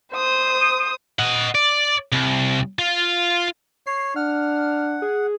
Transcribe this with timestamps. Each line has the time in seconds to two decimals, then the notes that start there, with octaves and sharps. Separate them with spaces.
0.13 C5 D#6
1.19 D#5 F#5
1.55 D5
2.13 C2
2.79 F4
3.87 C#5 C7
4.16 D4 F#5 F6
5.02 G#4